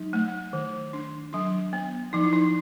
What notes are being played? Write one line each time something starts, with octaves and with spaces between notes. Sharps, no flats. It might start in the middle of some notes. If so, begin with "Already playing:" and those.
Already playing: F#3 D#4
A3
D#3
D4
F#3 D4
B3
F3 D#4
E4
D#4